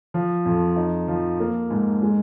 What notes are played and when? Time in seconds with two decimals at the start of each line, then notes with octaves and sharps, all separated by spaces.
0.14 F3
0.45 F2
0.76 D#4
1.08 F3
1.40 A#3
1.71 G#2
2.02 G#3